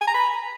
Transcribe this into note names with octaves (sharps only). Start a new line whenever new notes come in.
G#5
A#5
B5